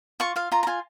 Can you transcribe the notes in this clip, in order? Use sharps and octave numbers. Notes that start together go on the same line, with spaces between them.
F4 C#6
F4 F5
F4 A#5
A#5
F4 G#5